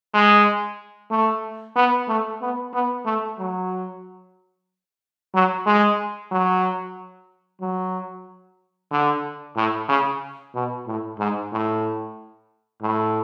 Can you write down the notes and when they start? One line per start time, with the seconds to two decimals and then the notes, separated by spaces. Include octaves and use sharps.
0.14 G#3
1.11 A3
1.76 B3
2.08 A3
2.41 B3
2.74 B3
3.05 A3
3.39 F#3
5.34 F#3
5.66 G#3
6.31 F#3
7.61 F#3
8.91 D3
9.56 A2
9.88 C#3
10.54 B2
10.87 A2
11.19 G#2
11.52 A2
12.82 A2